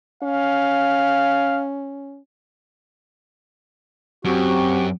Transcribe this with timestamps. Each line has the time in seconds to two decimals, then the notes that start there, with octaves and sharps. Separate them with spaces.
0.23 C#4 F5
4.25 F#2 C4 F#4 G4